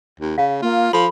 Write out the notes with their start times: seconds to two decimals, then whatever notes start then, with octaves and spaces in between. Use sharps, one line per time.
0.20 D#2
0.38 C#3 F5
0.62 A#3 F4
0.93 F3 A4 F5 B5